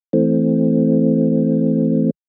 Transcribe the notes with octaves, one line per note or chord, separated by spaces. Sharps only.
E3 A3 C4